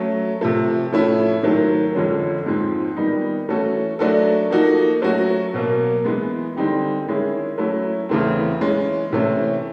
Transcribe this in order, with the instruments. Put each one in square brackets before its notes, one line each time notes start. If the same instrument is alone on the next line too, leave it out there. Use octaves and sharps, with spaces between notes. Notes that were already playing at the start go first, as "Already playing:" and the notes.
Already playing: [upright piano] F#3 A3 C#4
C3 F3 A3
A2 F3 A3 C#4 E4
G#2 D#3 F#3 A3
F2 D3 F3 G#3 C#4
G#2 F3 G#3 C4
D#3 G3 B3 D#4
E3 A3 C#4 F#4 A4
F#3 A3 D4 F#4 A4
F3 A#3 D#4 F#4 A4
F#3 A3 C#4 F#4
B2 F#3 A#3
E3 G#3 B3
D3 G3 C4 D#4 G4
D#3 G#3 C#4 E4 G#4
F#3 A3 C#4 E4
E2 C#3 E3 A3 C4
E3 G#3 C#4
C3 E3 A3 C#4